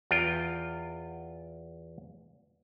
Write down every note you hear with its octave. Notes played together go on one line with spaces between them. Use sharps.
E2 F4 G5